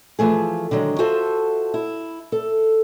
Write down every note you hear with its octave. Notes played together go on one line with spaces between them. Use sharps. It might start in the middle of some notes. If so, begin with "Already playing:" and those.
E3 F3 A3 G#4
D3 D#3 F#3 G#3
F4 F#4 A4 C5 E5
E4
A4